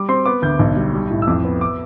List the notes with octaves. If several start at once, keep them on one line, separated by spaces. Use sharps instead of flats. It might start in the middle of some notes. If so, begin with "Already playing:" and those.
Already playing: G3 D6
C4 C6
B3 D6
D2 G6
B1
G3
G3
A2
E6
F2 D6
B3
D6